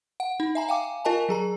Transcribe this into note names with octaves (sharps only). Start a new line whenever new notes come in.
F#5
D#4
E5 G#5 A#5
F5 G5 G#5 D6
F4 A#4 D#5 G#5 A5
F#3 G#4 A#5